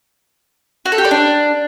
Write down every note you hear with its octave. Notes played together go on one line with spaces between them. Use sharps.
F#4
A4
G4
D5
D4